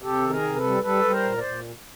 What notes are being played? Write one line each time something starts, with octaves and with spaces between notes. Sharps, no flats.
C3 G4 A4
D#3
G#4 A#4
C3
A4 B4
G3
G3 A4 B4
G3
A#4 C5
A#2
C5 D5
A#2